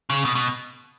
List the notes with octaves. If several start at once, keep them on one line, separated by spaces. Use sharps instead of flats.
C#3
B2
B2